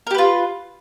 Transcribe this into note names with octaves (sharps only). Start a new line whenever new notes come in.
F4 G4 A#4 B4